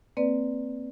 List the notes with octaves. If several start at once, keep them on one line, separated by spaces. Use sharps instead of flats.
A#3 C4 B4 D5